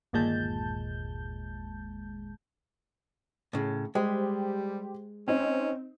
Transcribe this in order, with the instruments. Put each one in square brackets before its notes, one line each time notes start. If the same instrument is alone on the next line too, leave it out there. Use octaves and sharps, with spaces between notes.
[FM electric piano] G1 D#2 A#2 G#3 A5 G6
[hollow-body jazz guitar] A2 C#3
[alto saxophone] G3 [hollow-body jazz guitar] G#3 [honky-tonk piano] G4 C5
[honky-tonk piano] C4 D#4 [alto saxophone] C#4